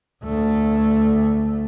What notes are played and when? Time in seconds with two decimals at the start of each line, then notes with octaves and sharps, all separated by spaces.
0.25 D2 A3